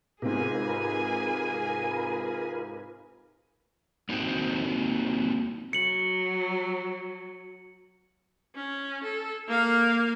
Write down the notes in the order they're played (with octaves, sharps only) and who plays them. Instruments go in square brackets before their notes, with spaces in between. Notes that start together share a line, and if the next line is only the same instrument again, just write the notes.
[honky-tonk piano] G#2 C3 [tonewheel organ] F4 A#4 B4 [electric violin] G#4 G#5
[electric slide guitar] A#3 C4 D#4 F#4 C5 G5
[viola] F#3 [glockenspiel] C#7 F#7
[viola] C#4
A4
A#3 F5